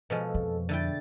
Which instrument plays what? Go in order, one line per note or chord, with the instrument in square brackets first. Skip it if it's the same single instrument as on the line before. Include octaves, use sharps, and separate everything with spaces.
[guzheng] B2 F3 G#3 [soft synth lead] A4
[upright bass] F2
[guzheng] D3 E4 G5 [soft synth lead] A6